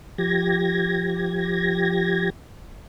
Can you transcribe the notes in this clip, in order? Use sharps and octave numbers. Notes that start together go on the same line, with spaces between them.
F3 G4 G#6 A#6